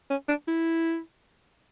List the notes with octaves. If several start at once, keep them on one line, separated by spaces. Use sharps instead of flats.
C#4
D4
E4